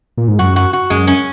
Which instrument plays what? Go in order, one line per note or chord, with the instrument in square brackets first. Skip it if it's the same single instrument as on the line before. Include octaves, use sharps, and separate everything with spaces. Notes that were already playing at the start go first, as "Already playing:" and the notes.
[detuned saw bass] A#2
G#2
[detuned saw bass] F#2 [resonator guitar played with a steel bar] F#4
[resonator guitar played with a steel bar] F#4
F#4
[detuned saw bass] F#2 [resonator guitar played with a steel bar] G#3
[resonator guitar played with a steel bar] C#4